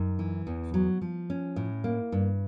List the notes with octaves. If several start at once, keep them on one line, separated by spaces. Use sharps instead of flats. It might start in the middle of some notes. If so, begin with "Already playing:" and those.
Already playing: F#2 D#4
E3
E2
F#3
F3
C#4
A2
A#3
G2